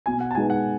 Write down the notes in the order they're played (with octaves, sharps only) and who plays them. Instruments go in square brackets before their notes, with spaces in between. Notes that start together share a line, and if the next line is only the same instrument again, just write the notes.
[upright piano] B2 [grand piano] G#5
[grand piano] F#5
A5
[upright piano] G#3 D#4 G#4 B4 [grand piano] G#5
[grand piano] F#5